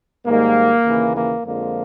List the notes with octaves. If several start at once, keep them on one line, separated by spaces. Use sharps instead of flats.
G#2 D#3 G3 A#3
D#2 C#3 E3
A#3
F2 D3 F3 G#3 A#3